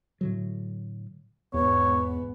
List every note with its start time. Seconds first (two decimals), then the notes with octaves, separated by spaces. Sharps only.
0.21 A2 D3 F#3
1.54 E1 E2 G#2 B3 C#5